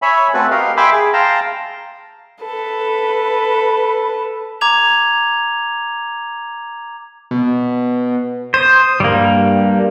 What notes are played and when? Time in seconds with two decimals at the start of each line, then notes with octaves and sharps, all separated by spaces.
0.02 C#5 E5 G#5 B5
0.34 A3 C4 F#4 A4 B4
0.51 G4 A#4 D#5 F5
0.77 E5 G5 G#5 B5 C6 D6
0.93 G#4
1.13 F5 G5 A5 A#5 C6
2.42 A4 B4
4.61 A#5 D6 G#6 F7
7.31 B2
8.54 C5 D#6
9.00 G2 G3 A#3